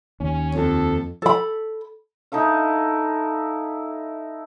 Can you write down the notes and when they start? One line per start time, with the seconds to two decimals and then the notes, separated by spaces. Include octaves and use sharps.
0.20 D#2 C#4
0.55 F2 A4
1.22 A4 B5
2.32 D#4 E4 A4 F5